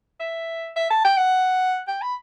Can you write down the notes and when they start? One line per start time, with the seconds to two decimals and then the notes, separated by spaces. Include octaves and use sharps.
0.20 E5
0.76 E5
0.91 A5
1.04 G5
1.17 F#5
1.88 G5
2.02 B5